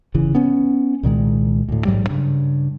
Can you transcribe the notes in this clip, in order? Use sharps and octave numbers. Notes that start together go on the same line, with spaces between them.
G1 C#3 E3
B3 C#4
C2 A#2 D#3 G#3
D2 A2
A1 G#2 F#3 G3
G2 C#3